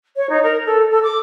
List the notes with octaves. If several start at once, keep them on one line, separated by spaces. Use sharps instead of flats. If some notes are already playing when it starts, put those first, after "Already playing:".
C#5
D#4
A#4
A4
A4
D6